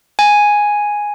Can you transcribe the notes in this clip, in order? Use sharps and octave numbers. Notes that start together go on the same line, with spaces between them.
G#5